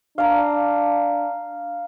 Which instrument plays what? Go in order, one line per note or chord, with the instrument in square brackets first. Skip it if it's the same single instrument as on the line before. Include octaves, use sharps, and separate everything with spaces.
[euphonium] D4 [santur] F5 A#5